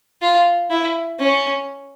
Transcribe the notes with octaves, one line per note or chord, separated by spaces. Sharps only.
F4
E4
C#4